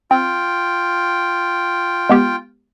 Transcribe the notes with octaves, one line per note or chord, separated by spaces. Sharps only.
C4 F4 G5
G#3 B3 G4